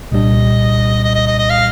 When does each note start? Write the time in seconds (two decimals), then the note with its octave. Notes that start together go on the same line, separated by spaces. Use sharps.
0.11 C2 A#2 G3 D4 D#5
1.04 D#5
1.15 D#5
1.27 D#5
1.39 D#5
1.50 F5